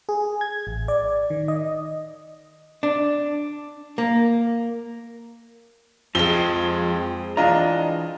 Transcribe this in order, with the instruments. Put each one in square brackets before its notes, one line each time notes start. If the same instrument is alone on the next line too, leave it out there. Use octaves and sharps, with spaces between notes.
[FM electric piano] G#4
G#6
A1
D5
D#3
D#5
[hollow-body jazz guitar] D4
A#3
[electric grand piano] F2 [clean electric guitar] F3 [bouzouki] G#3 C4 [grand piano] G7
[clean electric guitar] E3 A#5 [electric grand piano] D4 D#5 [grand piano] F4